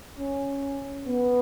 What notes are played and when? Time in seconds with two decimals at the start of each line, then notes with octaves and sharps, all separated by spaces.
0.18 C#4
1.07 B3